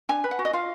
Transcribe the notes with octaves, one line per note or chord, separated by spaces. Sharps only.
D4 G#5
B4
F#5
F#4
D#5
F4 F5